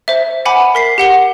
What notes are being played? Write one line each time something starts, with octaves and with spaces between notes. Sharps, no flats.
C5 E5
F#5 G#5 B5 D6
A#4 B6 C7
G4 F#5 G7